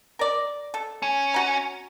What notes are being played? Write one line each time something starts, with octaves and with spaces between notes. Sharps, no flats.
A#4 D5
A4
C#4
F#4 A#5